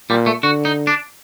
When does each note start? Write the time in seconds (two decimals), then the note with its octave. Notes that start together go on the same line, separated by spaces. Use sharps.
0.09 A#2 G3
0.26 A3
0.43 D3 F#4
0.65 D#4
0.87 D4